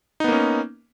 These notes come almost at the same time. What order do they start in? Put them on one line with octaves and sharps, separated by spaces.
D#4 B3 A#3 C#4